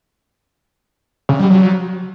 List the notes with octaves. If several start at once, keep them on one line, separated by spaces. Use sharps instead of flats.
C#3
G3
F#3